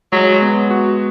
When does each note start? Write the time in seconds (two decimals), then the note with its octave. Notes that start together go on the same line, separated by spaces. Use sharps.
0.12 F#3 G#3
0.42 B3
0.71 F#4